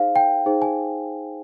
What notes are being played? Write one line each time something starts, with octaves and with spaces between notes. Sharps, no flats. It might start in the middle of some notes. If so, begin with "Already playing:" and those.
Already playing: D#4 G#4 C5 F5
G5
D#4 G#4 C5
G#5